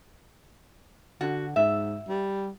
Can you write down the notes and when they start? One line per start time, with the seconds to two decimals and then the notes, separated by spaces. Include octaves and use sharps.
1.21 D3 F#4
1.56 G#2 E5
2.08 G3